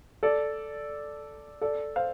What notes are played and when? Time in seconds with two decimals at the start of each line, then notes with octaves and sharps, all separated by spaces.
0.23 A4 D5
1.61 A4 D5
1.96 C5 F5